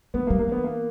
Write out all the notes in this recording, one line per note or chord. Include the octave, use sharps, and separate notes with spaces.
G#3 B3
A#3
G3
A#3
E3 B3
A#3